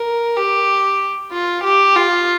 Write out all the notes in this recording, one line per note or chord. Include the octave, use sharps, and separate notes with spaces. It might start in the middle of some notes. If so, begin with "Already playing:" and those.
Already playing: A#4
G4
F4
G4
F4